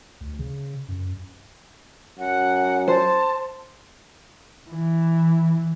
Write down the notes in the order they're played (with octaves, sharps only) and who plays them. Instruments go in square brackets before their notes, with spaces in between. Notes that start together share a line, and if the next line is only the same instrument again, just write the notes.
[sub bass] D2
C#3
F#2
[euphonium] F#2 [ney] F#5
[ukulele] C5 [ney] A5
[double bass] E3